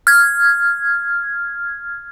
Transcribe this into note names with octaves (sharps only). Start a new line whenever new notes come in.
F6 G#6